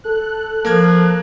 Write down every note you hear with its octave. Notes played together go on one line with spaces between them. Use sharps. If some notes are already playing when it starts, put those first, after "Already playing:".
A4 F#6
F3 A#3 A#4 G#6